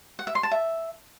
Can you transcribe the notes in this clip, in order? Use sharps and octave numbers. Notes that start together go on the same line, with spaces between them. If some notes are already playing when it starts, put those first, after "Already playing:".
F#5
E5
C6
A5
E5